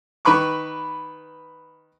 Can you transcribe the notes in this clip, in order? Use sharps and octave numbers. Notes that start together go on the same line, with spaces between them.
D#3 B4 B5 C#6 D6